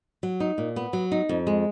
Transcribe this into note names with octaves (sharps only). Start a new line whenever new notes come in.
F#3
D#4
A#2
B3
F#3
D#4
F2
G#3